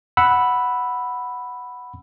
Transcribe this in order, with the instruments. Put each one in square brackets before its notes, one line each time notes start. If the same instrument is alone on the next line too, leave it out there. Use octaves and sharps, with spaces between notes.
[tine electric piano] F#5 B5 E6